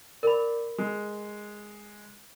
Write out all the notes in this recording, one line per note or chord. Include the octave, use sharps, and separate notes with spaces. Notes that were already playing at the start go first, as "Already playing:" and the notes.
A#4 D5 B5
G#3